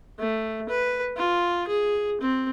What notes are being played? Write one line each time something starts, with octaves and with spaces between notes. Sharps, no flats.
A3
B4
F4
G#4
C4